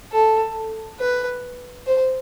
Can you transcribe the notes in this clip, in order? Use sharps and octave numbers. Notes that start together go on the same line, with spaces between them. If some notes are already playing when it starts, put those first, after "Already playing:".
A4
B4
C5